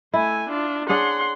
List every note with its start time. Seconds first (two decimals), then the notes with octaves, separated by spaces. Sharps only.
0.14 A3 E4 G#5
0.49 D4 F4
0.89 D4 G#4 C#5 F#5 C6